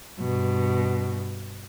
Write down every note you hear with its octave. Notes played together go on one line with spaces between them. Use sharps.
G2 B2